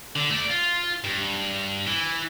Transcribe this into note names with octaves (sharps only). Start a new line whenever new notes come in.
D3
A3 D5
F4
G2
E3